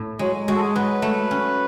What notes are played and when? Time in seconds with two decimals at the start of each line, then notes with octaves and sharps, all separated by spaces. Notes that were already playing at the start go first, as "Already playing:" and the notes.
Already playing: A2
0.19 F#3 G#3
0.48 G#3 F#4
0.55 A4
0.62 G#4
0.75 F#3 B4
1.02 A3
1.31 C#4